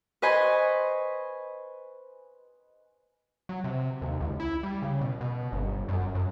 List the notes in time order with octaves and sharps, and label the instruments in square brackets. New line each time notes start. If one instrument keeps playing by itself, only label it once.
[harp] B4 C5 D#5 G#5 C6 C#6
[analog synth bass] F#3
C3
D#2
C#2
E4
G3
C#3
B2
B2
G1
F#2
F#2